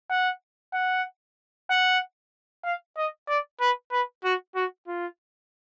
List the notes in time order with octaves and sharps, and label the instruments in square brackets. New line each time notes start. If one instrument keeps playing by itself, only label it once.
[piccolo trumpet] F#5
F#5
F#5
F5
D#5
D5
B4
B4
F#4
F#4
F4